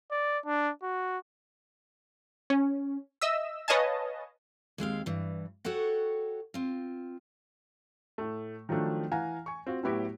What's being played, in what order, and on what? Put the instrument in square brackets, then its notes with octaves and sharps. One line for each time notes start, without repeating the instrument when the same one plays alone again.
[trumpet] D5
D4
F#4
[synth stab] C#4
D#5 E5 E6
B4 C#5 D#5 F5 G#5 A5
[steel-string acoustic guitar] D#2 G#3 C4 F5
G2 E3
F#4 A4 C#5 F#5 G5
C4 F4
[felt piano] A2 A3
D#3 F3 F#3 A3 D4
E3 F5 F#5 G#5 A#5
G#5 C#6
C4 F4 F#4
A2 F#3 B3 E4 F#4 G4